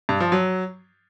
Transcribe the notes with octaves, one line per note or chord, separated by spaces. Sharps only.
G2
F3
F#3